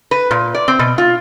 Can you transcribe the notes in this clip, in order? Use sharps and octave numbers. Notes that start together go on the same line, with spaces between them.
B4
A#2
D5
C4
B2
F4